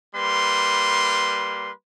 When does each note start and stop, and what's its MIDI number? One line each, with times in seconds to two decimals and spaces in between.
0.15 1.71 55
0.15 1.71 58
0.15 1.71 71
0.15 1.71 84